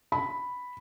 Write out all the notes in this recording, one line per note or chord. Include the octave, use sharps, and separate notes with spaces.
B5